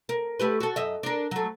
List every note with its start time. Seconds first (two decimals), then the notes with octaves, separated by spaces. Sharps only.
0.09 A#4
0.40 A3 G4 B4
0.60 F#4 A4
0.76 F#2 D#5 E5
1.03 D4 A#4
1.31 F#3 A3